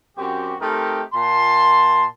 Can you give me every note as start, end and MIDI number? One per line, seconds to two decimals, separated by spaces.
0.17 0.54 42
0.17 0.54 60
0.17 0.54 66
0.17 0.54 67
0.60 1.02 57
0.60 1.02 60
0.60 1.02 63
0.60 1.02 67
0.60 1.02 70
1.13 2.06 46
1.13 2.06 81
1.13 2.06 84